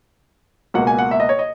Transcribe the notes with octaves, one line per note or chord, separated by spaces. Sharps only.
C#2 B2 A#3 F#5
G#5
F#5
E5
D#5
C#5
D#5